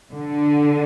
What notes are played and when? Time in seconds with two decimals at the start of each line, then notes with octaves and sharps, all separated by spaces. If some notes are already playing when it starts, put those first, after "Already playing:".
0.12 D3